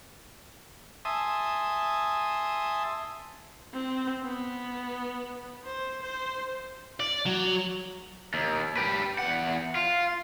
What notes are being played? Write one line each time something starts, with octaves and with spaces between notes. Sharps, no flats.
E5 G#5 A5 C6 D#6
C4
B3
C5
C5
D5
F#3
D#2
G4 B4
E2 F#5
F4